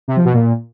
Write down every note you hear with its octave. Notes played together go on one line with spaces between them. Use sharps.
C3
F3
B2
A#2